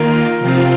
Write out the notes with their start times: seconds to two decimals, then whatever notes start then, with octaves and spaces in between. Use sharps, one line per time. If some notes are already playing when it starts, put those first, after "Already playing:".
Already playing: D#3 A#3 F4 A#4
0.39 C3 F3 C4 F4